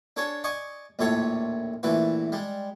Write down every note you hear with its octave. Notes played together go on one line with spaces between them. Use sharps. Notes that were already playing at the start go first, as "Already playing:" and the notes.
D4 A4 C#5 G#5
D5 D#5 G#5 C#6
A#1 D#2 A2 A4 C#5 C6
A#1 E3 A3 E4 B4
G3 G#3